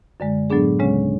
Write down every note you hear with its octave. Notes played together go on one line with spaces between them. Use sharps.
F#2 D3 G#3
A2 F#3 B3 D4 G#4
D2 C#3 G#3 C#4